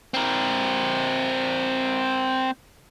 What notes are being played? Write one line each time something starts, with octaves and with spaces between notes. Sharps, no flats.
C4 A#4